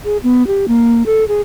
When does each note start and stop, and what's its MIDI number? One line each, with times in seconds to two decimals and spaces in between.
0.05 0.17 68
0.23 0.46 59
0.47 0.66 67
0.68 1.03 58
1.06 1.27 69
1.28 1.41 68